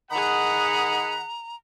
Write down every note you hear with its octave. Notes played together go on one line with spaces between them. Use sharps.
D#3 G#4 D#5 F#5 A#5 B5